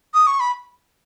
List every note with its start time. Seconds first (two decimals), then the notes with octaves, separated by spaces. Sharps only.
0.14 D#6
0.27 C#6
0.40 B5